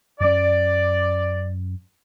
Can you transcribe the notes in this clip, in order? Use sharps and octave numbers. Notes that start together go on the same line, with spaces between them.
F#2 C#4 D5